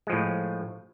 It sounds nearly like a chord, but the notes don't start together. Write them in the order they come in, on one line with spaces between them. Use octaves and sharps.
G#3 F3 A2